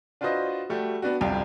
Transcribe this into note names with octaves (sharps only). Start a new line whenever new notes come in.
D4 F4 F#4 B4 C5 D#5
G3 A3 F#4 G4
B3 D4 F#4
G1 C2 F2 F4 G5